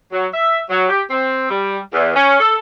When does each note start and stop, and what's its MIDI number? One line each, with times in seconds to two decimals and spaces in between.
0.11 0.26 54
0.33 0.60 76
0.70 0.86 54
0.88 1.01 67
1.09 1.49 60
1.50 1.78 55
1.92 2.16 40
2.16 2.36 61
2.39 2.58 69